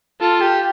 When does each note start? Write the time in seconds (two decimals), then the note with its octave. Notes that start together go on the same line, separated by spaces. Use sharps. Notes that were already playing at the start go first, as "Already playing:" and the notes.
0.20 F4 A4
0.41 G4